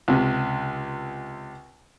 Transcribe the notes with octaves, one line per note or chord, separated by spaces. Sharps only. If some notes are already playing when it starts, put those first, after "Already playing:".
C#2 C3